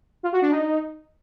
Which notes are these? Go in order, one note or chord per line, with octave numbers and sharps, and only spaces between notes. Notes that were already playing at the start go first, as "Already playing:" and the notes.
F4
F#4
D4
D#4